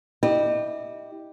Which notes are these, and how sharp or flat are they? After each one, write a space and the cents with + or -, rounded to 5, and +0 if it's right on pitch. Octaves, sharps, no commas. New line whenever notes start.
E4 -30 G4 +0 D#5 -35